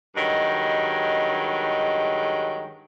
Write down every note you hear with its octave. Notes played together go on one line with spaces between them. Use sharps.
G2 D#3 F#3 G#3